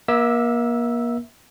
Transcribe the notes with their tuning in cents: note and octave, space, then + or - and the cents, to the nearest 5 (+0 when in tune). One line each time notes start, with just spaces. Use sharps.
A#3 +35 E5 -15 E6 +0